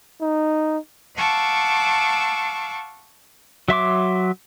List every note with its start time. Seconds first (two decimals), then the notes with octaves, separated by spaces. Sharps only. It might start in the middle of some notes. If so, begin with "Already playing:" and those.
0.21 D#4
1.16 F5 F#5 A5 C#6 D6 E6
3.68 F#3 E5 C6 D6